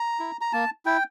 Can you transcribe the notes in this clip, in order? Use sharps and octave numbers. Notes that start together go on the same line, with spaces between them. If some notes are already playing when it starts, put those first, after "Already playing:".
Already playing: A#5
E4
A#5
A#3 A5
E4 G5